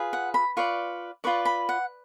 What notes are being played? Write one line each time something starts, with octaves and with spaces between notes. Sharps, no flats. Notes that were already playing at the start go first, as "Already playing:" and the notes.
Already playing: F4 G#4 B4
F#5
B5
F4 B4 D5 C#6
F4 B4 D5 C#6
B5
F#5